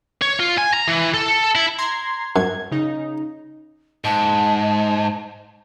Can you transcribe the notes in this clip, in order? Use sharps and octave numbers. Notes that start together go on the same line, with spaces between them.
C#5
F4
G#5
A#5
E3
A4
E4
A#5 C6 G#6
F#2 G#6
C#3 D#4
G#2 A5